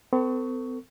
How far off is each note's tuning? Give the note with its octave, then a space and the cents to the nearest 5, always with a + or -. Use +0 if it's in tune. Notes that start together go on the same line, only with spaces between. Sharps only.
C4 -45 A4 +35 C#6 +10